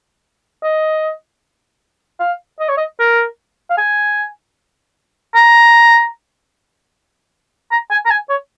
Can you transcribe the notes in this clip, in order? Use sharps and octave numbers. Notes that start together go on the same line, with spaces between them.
D#5
F5
D#5
C#5
D#5
A#4
F5
G#5
A#5
A#5
G#5
A#5
G#5
C#5